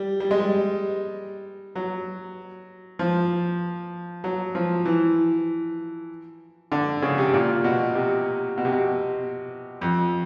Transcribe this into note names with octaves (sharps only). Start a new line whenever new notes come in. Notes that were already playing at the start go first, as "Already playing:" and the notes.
Already playing: G3
G3
G#3
G3
F#3
F3
F#3
F3
E3
D3
C#3
C3
A#2
B2
C3
B2
C3
B2
F2